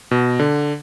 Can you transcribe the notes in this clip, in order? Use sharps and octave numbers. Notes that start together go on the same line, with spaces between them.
B2
D3